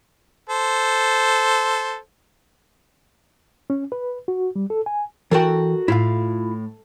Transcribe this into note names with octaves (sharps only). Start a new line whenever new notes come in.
A4 C5
C#4
B4
F#4
G3
A4
G#5
E3 F#4 A4 A#4 G5
A2 E4 F4 F5